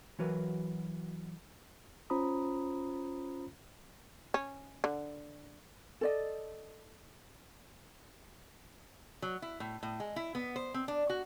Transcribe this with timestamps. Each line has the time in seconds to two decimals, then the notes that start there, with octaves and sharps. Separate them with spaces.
0.19 E3 F#3 F#4 A#4 B4
2.10 C#4 F4 C5 A#5 B5 D#6
4.34 C#4
4.84 D3
6.01 A4 D5 D#5
9.22 F#3
9.42 E4
9.60 A2
9.83 A2
10.00 G#3
10.16 E4
10.35 B3
10.56 C5
10.74 C4
10.88 D4
11.10 F#4